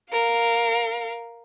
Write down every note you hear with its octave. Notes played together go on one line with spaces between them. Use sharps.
A#4 F5